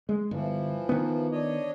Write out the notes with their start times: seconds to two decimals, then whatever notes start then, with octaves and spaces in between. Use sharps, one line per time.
0.09 G#3
0.31 G1 E3 F3
0.89 D#3 B3
1.32 D4 C#5 D#5